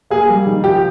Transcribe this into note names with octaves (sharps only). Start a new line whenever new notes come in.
A#3 G#4
G3
D#3
F3 G4